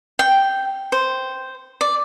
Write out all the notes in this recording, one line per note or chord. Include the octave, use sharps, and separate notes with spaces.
G5
C5
D5